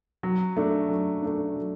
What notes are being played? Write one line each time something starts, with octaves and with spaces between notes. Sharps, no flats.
F#3
A3 D4
F#3
A3 D4
F#3